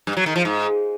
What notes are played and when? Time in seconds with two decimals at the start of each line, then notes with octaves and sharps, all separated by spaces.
0.07 G2
0.17 F#3
0.26 D#3
0.36 F3
0.45 G#2